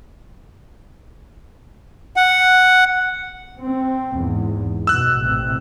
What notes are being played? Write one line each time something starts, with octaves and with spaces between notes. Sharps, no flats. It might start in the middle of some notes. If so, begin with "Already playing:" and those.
F#5
C4
E2 G#2
F#2 B2 E6 F#6
A1 C3